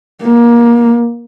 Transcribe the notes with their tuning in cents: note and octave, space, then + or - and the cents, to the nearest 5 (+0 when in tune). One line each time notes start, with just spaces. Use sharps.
A#3 +25